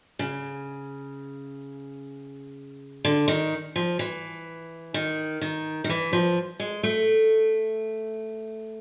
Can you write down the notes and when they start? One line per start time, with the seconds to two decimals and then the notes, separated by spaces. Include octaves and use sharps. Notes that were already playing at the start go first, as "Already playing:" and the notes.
0.19 C#3
3.05 D3
3.28 D#3
3.76 F3
3.99 E3
4.94 D#3
5.41 D#3
5.84 D#3
5.89 E3
6.13 F3
6.60 G#3
6.83 A3